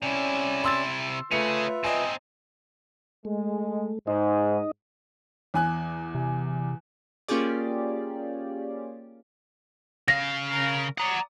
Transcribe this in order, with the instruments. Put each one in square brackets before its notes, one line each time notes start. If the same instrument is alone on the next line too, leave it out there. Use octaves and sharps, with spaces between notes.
[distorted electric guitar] C3 E4 [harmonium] C#4 D5 G#5
[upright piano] C6 E6 A6
[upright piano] A3 C#7 F7 [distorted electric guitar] C#4 G#4 [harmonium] F4 B4 E5
[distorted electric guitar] C4 D#4 [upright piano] D#5 G#5
[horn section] G#3 [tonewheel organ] A3
[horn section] G#2 [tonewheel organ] D#4 D#5
[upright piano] E2 G#5 F#6
[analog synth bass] C3
[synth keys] A#3 C#4 F4 G4 G#4 D5
[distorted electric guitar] C#3 F5 [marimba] A#6
[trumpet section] A#4
[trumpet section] D5 D#6 [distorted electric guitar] F#5 A#5